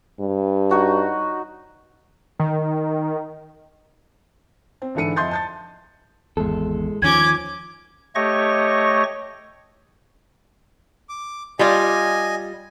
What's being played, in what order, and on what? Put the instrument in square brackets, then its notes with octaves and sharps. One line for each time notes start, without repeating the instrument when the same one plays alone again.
[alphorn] G2
[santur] D#4 F#4 C#5
[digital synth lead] D#3
[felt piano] C4
G#2 D3 E3 A4 C#7 D#7
F2 D#5 E5 C6 G6 A6
A5 G6 A6
[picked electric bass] G#1 E2 [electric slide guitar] G#3 A4
[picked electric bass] D#2 D#3 F3 [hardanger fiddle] C#4 D6 [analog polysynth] G#6
[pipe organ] A3 G4 C#5 D#5 C#6 A#6
[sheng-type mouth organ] D6
[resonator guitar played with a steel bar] G3 F4 D5 [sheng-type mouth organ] D#5 G#5